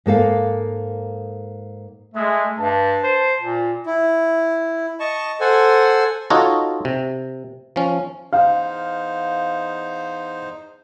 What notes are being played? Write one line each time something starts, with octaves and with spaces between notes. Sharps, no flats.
G#2 A#3 A4 F5
G#3 A3
G2 A5
C5
A#2
E4
D#5 A5 C#6
A4 C5 F#5 G#5
D#4 F4 F#4 A4 C#5 D#5
C3
F3 C#4
E2 D#4 C5 F5